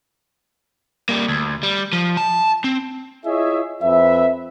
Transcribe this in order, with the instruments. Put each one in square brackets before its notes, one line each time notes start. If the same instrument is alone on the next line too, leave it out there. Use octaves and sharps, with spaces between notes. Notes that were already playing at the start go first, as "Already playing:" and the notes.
[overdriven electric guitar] G3 A#3
D2
G3
F3
A5
C4
[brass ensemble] E4 F4 G#4 C#5 D#5 E5
F2 C4 B4 E5